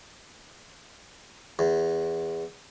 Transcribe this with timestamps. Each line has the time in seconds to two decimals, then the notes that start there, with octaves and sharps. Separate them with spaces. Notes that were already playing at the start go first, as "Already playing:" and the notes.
1.59 E2